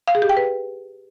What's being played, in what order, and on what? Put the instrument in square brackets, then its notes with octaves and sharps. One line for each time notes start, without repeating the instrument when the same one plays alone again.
[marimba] F5
G#4
G4
G5
B4